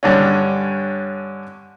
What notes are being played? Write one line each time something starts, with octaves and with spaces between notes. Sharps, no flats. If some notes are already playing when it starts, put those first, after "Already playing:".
G2 D3 C#4